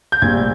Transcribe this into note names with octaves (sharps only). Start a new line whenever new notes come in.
G6
A#1 A#2 G3 G#6